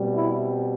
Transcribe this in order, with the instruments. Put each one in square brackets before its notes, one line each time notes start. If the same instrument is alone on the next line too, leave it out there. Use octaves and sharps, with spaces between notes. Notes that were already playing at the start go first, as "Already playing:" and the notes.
Already playing: [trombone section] B2 G3 C4
E4